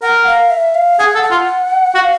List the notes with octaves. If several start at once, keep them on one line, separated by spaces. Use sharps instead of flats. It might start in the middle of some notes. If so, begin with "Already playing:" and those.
A#4 F#5
F5
E5
F5
G#4 F#5
A4
F#5
F4
F#4 F5